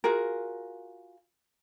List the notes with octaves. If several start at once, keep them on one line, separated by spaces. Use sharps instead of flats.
F4 F#4 G#4 A#4